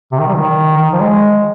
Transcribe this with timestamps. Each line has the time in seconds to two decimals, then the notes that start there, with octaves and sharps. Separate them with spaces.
0.12 C3
0.20 D#3
0.28 G3
0.36 D#3
0.76 D#3
0.93 F3
1.00 G#3